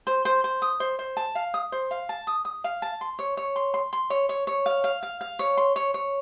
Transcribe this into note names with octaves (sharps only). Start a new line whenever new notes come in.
C5
C5
C5
D#6
C5
C5
A5
F5
D#6
C5
F5
A5
D#6
D#6
F5
A5
C6
C#5
C#5
C6
C6
C6
C#5
C#5
C#5
F5
F5
F5
F5
C#5
C6
C#5
C#5